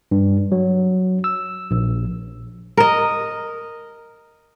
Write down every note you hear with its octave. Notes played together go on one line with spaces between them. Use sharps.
G2
F#3
E6
A#1
A#4 D#5